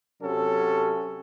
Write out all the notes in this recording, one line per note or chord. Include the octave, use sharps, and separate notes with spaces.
C3 F#3 C#4 A4